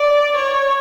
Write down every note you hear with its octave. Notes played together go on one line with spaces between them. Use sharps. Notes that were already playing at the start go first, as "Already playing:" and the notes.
Already playing: D5
C#5